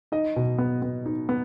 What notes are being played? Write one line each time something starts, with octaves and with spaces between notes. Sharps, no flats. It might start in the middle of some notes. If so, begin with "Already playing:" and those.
D#4 D#5
B2
B3
B3
D#4
B3